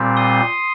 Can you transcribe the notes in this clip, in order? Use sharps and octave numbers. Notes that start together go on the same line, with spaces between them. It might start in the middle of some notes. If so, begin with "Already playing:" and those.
Already playing: A#2 G3 C4
C6 D#6